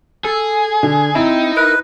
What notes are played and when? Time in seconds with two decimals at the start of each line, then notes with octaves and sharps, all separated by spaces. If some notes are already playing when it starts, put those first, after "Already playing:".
0.24 G#4 A4
0.83 D3
1.15 C4 D#4 E4
1.57 A#4 B4